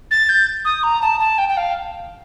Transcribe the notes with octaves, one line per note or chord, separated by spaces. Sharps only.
A6
G6
D#6
A#5
A5
A5
G5
G5
F5